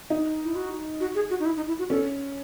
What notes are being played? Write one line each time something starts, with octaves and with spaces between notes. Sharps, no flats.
D#4
E4
F#4
F#4
G#4
F#4
D#4
E4
D#4
E4
F#4
C#4 A4